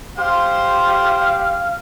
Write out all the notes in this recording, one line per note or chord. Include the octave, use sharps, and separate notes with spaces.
G4 C5 F5 C6